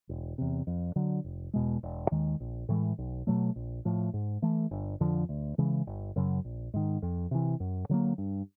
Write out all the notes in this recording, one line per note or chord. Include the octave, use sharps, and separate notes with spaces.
E1
E2 C3
F2
D3 F#3
F1
E2 B2 G#3
E1
D#2 D#3 G#3
A#1
A2 E3 G#3
B1
B2 F#3 A3
A#1
A2 F3
G#2
E3 A3
G1
F2 D3 F3
D2
C#3 E3 G#3
G1
F#2 C#3 F#3
A#1
G#2 D#3
F2
C3 E3
F#2
D3 F#3 A#3
G2